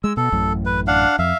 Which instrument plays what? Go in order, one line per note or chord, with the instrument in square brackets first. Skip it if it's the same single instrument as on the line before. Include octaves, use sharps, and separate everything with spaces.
[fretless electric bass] G#3 [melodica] E6
[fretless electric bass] B2 [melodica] A4
[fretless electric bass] A1 F#2 A2
[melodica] B4
D4 F5 F#5
[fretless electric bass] F2 [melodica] E5 F5